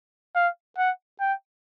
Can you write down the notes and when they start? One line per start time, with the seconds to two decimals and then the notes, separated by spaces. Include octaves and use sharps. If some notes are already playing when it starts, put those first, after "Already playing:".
0.36 F5
0.78 F#5
1.20 G5